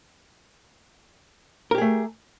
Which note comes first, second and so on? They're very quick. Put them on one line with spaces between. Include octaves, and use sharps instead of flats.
A#4 G4 G#4 A3